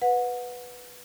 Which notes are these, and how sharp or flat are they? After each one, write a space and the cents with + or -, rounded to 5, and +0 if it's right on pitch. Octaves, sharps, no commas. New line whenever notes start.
B4 +0 F#5 -25